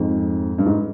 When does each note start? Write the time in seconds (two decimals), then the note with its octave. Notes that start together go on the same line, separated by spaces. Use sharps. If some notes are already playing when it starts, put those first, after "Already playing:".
Already playing: F2 G#2
0.58 G2
0.66 G#2